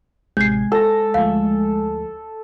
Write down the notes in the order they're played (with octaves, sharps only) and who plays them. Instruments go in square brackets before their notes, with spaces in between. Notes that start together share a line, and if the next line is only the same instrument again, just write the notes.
[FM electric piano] A1 C3 G#6 [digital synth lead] G#3 [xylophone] G6 C7
[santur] A4 [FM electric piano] C5 A#6
[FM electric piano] D2 F3 A3 [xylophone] F5